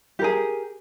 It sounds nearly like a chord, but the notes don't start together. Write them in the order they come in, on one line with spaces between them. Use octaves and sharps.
G4 A#4 G#4